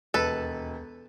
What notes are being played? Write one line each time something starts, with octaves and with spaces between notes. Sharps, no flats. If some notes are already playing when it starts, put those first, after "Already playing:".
E1 D#2 A4 B4